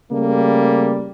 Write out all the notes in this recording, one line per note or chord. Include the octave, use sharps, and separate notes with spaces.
C#3 G3 A3 A#3